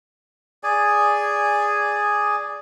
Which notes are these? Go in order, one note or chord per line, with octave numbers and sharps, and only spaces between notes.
G#4 D5 G#5